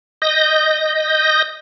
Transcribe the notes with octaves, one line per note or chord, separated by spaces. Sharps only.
D#5 G6 A#6